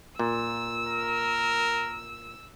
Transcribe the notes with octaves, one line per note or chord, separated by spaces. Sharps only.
A#2 E6
A#4